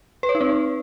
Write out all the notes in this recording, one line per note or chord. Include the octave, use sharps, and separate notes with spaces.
B4
C#5
D#4
C4